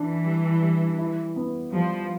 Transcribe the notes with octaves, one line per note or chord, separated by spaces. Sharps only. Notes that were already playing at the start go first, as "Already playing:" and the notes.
Already playing: E3 D4
G3
G3
E4
B3
F3 G3